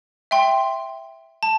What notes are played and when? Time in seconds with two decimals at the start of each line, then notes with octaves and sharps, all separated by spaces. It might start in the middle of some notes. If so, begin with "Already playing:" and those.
0.31 E5 G5 C6
1.43 A5